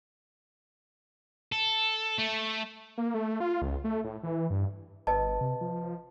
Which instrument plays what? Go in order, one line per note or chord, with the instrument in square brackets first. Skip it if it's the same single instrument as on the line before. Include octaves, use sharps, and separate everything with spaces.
[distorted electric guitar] A4
A3
[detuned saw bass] A#3
A3
F4
C#2
A3
A2
E3
G2
[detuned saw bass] G1 [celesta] B4 D#5 A5
[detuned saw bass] C3
F3